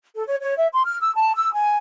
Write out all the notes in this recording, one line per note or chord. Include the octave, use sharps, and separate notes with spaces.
A4
C#5
C#5
E5
C6
F6
E6
A5
E6
G#5